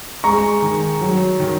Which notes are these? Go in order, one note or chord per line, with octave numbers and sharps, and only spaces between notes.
G#3 A#5 C#6
D#3
F#3
D#3